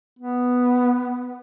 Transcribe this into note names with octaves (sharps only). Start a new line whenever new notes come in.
B3